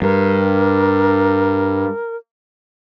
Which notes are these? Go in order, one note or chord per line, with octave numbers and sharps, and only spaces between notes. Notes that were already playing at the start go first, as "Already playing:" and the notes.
G2 A#4